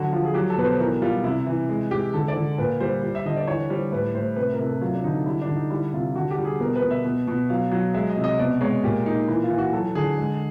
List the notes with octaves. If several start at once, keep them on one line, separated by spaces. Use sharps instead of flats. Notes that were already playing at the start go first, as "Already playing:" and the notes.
Already playing: D3 F#3 F#4
F3 F4
G#4
F#3 G4
A4
B2 B4
C5
E3 A#4
G3 F4
C3 E4
E3
G#3
G#3 G4
D3 A4
D5
D3
A#2 B4
G3 C5
G3
E5
D3 D#5
D5
E3 C#5
G3 C5
A2 B4
A2 C5
C3 B4
A#4
C3
A4
F#3 F4
D4
D3 D#4
G3 E4
D4
D3
D#4
G3 E4
C3 F4
D3 F#4
G4
G3
G#4
B2 A#4
B4
B2
E5
B2
B2
F#3 F5
F#3
G#3 E5
D#5
C3
D#5
B2 D5
G#3 C#5
A#2 G4
A#2 D#4
E3 E4
F4
E3
F#4
F#3 A4
D3 G#4
G#3